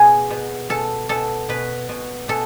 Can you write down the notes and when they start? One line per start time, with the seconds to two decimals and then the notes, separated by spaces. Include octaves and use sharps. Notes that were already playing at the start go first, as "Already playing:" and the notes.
Already playing: B2 G#4
0.30 B2
0.69 B2 A4
1.09 B2 A4
1.49 B2 B4
1.89 B2
2.28 B2 A4